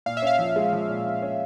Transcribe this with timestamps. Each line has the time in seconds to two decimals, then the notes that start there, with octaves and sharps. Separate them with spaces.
0.06 A#2 F5
0.17 E5
0.22 C#4 F5
0.39 F3
0.56 G#3
0.73 F3
0.89 A#2
1.06 C#4
1.22 C#4